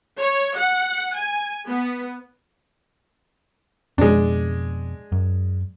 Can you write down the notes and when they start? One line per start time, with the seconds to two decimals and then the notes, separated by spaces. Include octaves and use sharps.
0.17 C#5
0.56 F#5
1.16 G#5
1.67 B3
3.98 F2 B2 G#3 D4
5.12 F#2